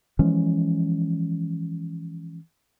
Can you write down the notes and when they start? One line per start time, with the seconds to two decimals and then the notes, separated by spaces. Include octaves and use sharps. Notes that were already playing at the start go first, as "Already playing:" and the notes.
0.19 E3 F3 G#3 C#4